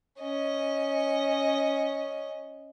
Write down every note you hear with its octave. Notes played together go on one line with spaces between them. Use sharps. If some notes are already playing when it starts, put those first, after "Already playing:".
C#4 D#5